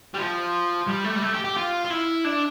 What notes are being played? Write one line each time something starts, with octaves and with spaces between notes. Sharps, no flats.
G3
F3
G3
A3
G3
A3
G4
G4
F4
F4
E4
D4